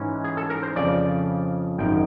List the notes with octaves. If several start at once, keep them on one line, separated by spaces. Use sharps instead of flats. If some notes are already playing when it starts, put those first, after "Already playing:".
Already playing: G#2 E3 G#3 C#4
G#4
A4
A#4
C5
F2 C#3 F3 D5
G#1 F#2 D#3 G5